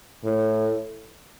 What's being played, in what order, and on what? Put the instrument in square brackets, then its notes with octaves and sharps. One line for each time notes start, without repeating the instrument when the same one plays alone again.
[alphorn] A2